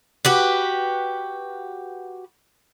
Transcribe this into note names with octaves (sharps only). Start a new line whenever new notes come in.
F#4 G4 B4